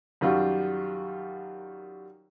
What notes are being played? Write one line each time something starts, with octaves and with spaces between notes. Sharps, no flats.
F#2 D#3 G3 F4 F#4